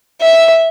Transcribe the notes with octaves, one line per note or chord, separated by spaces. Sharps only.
E5